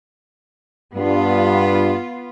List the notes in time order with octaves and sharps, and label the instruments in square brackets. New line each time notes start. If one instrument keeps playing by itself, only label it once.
[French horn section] G2 [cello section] B3 F4